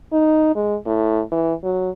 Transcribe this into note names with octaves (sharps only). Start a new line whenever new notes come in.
D#4
G#3
A2
E3
F#3